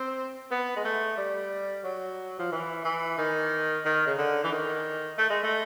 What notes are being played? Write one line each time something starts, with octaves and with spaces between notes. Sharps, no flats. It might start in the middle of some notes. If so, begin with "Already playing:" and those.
Already playing: C4
B3
G#3
A3
G3
F#3
F3
E3
E3
D#3
D#3
C#3
D3
E3
D#3
A3
G#3
A3